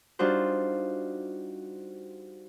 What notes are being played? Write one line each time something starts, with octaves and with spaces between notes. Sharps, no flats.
G3 D4 D#4 F4 F#4 C5